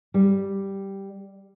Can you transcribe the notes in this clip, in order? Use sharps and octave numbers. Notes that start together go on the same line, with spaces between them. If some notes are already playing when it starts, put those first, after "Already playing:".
G3